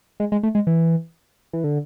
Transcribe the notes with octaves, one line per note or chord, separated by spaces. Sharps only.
G#3
G#3
A3
G#3
E3
E3
D3